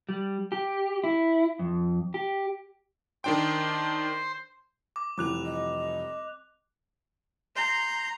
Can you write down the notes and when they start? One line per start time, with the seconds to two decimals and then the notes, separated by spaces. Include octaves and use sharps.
0.09 G3
0.52 G4
1.04 E4
1.59 F2
2.14 G4
3.24 D#3 D4 C5 G5 C6
4.96 D6
5.18 F1 E3 G3 D6 F#6 F7
5.46 D#5
7.56 A#5 C6 G6